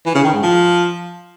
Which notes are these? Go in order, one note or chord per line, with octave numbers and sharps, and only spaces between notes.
E3
C#3
D#3
G#2
F3